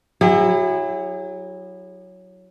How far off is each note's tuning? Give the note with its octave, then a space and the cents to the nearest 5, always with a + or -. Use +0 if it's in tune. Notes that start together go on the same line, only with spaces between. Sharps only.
F#3 +0 E4 +0 G#4 -45